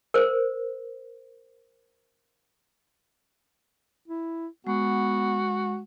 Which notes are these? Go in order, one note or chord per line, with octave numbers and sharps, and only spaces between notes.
A#4 C5
E4
G#3 B3 F#4